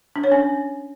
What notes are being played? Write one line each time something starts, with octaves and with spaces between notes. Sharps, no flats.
D4
C#5
C#4